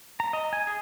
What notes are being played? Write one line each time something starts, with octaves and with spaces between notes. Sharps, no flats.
A#5
D#5
G#5
G#4